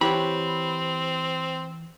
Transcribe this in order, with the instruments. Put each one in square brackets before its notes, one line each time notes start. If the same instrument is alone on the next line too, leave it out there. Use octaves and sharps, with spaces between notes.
[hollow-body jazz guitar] E3 [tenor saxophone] C4 [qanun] G4 C#5 F#5 [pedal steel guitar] B5